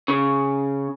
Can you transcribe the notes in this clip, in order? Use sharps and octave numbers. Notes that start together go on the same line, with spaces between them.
C#3